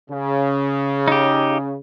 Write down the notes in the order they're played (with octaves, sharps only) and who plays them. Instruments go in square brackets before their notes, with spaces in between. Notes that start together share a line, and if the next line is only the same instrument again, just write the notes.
[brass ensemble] C#3
[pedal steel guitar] D#4 G4